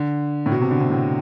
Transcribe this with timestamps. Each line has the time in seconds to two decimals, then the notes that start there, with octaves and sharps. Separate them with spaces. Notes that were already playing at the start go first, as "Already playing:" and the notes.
Already playing: D3
0.46 A2
0.52 B2
0.61 C3
0.71 D3
0.80 C3
0.90 A2